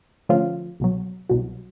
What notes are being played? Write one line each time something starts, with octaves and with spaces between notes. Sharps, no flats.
D3 F3 A3 C#4 F4
C2 B2 F#3
C2 B2 F#3